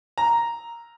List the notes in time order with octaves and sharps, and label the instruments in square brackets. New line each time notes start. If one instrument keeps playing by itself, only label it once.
[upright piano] A#5